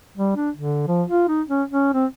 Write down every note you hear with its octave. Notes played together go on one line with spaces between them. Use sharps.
G3
D4
D3
F3
F4
D#4
C#4
C#4
C4